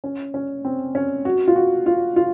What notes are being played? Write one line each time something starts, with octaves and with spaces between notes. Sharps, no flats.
C#4
C#4
C4
C#4
F#4
F4
F#4
F4
F4